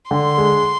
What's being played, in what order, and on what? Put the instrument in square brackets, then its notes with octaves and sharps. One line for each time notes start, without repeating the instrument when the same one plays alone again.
[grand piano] D3 [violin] C6
[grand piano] G#3